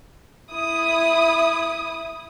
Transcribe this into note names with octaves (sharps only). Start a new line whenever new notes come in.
E4 D#6